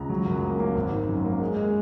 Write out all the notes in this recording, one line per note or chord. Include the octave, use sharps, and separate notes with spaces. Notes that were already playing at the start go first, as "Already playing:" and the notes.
Already playing: C#2 A#5
F#3
F#2
A#3
A#3
G#1
D#3
F#2
A#3
G#3
G#3